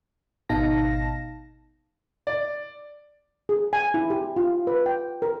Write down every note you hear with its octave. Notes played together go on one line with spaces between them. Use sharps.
G#1 B2 D#4 F5 A5 A#6
D5
G#4
G#5
E4
G4
F4
B4
G5
A#4